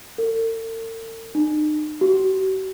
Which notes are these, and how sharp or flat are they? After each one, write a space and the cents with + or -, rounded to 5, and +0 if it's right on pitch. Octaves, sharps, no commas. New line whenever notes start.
A4 +45
D#4 -40
F#4 +45